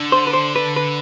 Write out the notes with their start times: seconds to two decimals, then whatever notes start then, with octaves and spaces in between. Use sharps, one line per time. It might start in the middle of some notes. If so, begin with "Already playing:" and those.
Already playing: D3
0.12 C5
0.27 B4
0.33 C5
0.56 B4
0.76 B4